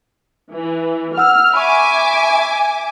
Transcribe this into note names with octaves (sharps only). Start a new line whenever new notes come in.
E3
F#5 E6 F6
E5 G#5 B5 C#6 D6